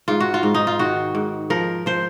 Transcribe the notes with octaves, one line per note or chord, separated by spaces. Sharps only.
G#2 F4
F#4
F4
G#2
D#4
F4
D#3 F#4
G#2
F3 A#4
F3 C5